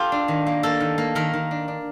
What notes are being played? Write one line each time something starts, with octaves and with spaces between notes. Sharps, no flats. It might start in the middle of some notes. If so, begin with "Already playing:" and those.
Already playing: F4 G4 A4
D4
D#3
A#3
A#3 A4
D#3
A#3
D#3 A#4
D#3
D4
D4